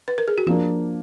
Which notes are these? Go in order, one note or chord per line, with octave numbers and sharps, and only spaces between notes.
B4
A#4
G#4
F#4
F3 A#3 D4 F4